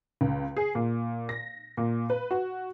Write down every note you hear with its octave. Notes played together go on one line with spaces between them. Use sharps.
C#2
G#4
A#2
A#6
A#2
B4
F#4